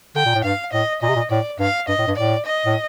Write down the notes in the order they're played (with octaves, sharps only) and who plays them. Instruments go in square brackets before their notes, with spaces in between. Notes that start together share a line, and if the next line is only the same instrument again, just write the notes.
[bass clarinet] D3 [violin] G5
[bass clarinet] A#2
A2
[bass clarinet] G2 [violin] F5
[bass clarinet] A2 [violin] D#5
[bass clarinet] A#2 [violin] D#5
[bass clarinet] C3
A#2
[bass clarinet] A2 [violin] D5
[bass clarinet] G2 [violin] F5
[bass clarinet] G2 [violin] D#5
[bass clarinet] A2
G2
[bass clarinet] A2 [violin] D5
[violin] D#5
[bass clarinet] A2